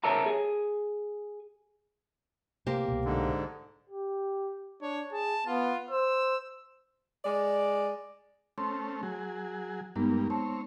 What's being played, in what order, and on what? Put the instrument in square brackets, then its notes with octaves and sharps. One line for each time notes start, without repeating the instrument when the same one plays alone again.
[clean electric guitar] A#4 C#5 E5 A5 A#5
G#4
[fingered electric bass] C3 [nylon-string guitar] A#3 G4 C5
[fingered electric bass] C2 B2
[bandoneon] G#2 D3
[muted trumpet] G4
[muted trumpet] D4 [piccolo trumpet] C#5
[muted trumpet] G#4 [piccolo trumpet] A5
[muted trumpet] B3 [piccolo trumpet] F4
[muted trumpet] C5 [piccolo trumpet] E6
[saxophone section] G#3 D5
[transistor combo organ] A3 C4 C#4 [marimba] C6
[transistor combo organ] F#3 G#4
[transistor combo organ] G2 A#3 [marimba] G#3 B3 D#4
[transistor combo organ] C4 C#5 [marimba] A5